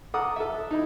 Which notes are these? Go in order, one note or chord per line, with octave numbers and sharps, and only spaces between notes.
A4 F#5 A#5 D6 D#6
A4 E5
D#4 E4